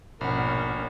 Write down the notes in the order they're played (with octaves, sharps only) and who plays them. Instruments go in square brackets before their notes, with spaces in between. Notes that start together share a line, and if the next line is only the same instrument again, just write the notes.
[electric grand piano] A#1 [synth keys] G#2 B2 [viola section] C#4 A#4 [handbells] F#5 B5